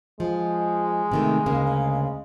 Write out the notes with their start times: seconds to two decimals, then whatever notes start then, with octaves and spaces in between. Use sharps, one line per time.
0.20 F3 G#3
1.12 C3 D#3 A3
1.46 D2 C#3 A#3